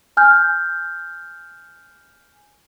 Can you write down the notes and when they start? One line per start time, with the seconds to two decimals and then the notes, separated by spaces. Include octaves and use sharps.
0.17 G#5 F6 G6